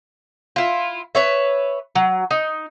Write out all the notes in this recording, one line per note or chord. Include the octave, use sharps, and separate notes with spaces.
E4 F4
B4 C#5 E5
F#3
D#4